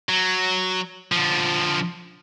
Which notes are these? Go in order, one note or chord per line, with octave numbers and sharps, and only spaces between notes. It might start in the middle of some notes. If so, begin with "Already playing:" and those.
F#3
D3 F3